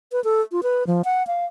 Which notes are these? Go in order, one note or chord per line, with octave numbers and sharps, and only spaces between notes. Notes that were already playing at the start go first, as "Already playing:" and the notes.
B4
A4
F4
B4
F3
F#5
F5